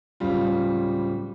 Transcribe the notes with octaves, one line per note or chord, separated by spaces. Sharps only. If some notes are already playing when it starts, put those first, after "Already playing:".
D1 C#3 G3 F4